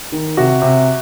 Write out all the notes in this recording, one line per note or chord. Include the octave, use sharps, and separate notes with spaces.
D#3
C3 F#4
C3